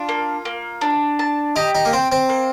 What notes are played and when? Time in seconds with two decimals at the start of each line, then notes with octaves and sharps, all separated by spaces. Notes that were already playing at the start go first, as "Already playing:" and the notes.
Already playing: D4 F4
0.09 A#3
0.45 A#3
0.81 D4
1.19 A5
1.56 D#4 G4
1.75 D#4
1.85 A#3
1.93 C4 G5
2.12 C4
2.29 A#3